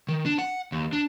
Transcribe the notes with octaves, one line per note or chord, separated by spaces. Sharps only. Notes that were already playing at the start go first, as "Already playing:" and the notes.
D#3
D4
F#5
D#2
D4